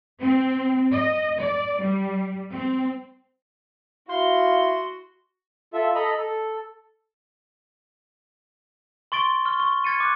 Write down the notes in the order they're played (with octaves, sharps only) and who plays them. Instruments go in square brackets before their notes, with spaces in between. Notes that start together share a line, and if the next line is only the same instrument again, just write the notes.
[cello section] C4
D#5
D5
G3
C4
[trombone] E4 [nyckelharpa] F#4 [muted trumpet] F5 [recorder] C6
[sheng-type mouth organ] F4 A4 E5
A4 D#5 A#5 B5
A4
[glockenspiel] C6 C#6 A6 D7 G7
C#6 F6
C#6
F6 G#6 A6 C#7 D#7
D6 F#6